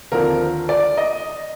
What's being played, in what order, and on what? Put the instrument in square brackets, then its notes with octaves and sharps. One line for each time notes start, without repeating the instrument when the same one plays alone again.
[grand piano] D#2 D3 F3 C4 A#4
D5
D#5